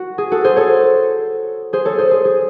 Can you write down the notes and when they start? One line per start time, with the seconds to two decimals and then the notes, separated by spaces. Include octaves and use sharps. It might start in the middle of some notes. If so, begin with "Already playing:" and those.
Already playing: F#4
0.18 G#4
0.31 F#4 A4
0.44 G#4 C5
0.56 A4 C#5
1.73 G#4 C5
1.85 A4 C#5
1.98 G#4 C5
2.11 G#4
2.25 G#4